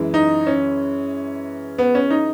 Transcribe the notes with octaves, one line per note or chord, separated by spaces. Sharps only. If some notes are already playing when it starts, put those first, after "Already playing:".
Already playing: F#2 E3 G#3
D#4
C#4
B3
C#4
D#4